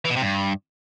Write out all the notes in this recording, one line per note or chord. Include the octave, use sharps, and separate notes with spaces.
E3
B2
C3
G2